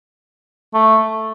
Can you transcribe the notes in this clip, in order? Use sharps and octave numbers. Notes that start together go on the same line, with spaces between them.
A3